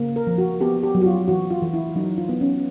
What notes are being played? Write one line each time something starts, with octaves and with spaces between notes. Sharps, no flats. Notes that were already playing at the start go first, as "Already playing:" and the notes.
Already playing: C#3 A#3
A#4
F3
F#4
B3 G4
G4
F#3
F#4
F4
E3 F#4
F4
E3
E4
F#3 D#4
F4
B3
C#4